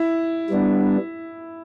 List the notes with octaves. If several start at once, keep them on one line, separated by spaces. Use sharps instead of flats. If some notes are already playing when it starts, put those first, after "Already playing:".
Already playing: E4
G3 B3 D4